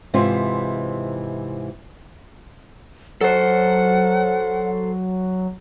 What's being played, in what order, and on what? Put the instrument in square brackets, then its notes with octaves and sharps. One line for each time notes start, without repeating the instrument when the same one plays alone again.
[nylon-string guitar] G#2 C3 E3 C4 F4
[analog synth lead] F#3 [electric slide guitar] A4 C5 [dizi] F#5